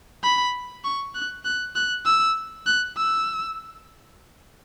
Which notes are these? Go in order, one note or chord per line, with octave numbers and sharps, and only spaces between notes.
B5
C#6
F#6
F#6
F#6
E6
F#6
E6